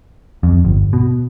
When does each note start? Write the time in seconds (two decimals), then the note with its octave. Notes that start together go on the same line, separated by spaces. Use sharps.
0.43 F2
0.65 G1
0.93 B2